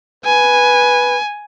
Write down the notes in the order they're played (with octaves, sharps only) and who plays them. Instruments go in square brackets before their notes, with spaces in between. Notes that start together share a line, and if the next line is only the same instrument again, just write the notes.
[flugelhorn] B4 [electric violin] G#5